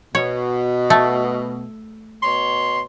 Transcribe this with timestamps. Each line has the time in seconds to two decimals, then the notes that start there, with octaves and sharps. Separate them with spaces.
0.15 B2 C#5
0.90 A3
2.23 B2 C#5 C6